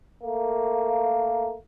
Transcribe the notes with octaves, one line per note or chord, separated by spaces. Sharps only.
A3 A#3